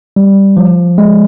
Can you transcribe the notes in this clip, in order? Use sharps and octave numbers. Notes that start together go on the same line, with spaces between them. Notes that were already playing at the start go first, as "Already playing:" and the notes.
G3
F3
G#3